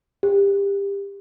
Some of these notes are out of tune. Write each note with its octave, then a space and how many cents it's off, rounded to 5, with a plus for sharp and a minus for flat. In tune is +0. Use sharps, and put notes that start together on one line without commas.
G4 +25